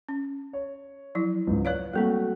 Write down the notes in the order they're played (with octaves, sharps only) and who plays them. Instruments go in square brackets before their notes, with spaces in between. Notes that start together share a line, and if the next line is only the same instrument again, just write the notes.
[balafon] C#4
[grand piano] C#5
[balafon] F3 F#3 E4
[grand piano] C#2 G#2
[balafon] B4 D5 F5 [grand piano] C#5 F#6
[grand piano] F#3 A3 F#4 [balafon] G3 A#3 C4